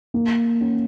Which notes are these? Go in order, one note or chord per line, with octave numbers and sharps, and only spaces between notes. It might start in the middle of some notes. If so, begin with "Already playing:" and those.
A#3
C#4